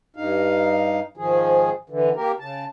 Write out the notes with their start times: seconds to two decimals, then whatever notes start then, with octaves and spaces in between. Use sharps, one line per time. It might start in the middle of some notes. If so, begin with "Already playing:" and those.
0.16 G2 D#4 F5
1.17 G#2 D#3 F3 G#4
1.90 D3 E3
2.16 A#3 G4 A#4
2.39 C#3 A5